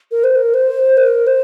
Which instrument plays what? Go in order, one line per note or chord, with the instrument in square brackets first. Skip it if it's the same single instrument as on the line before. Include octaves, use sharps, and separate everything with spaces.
[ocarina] A#4
C5
A#4
C5
A#4
C5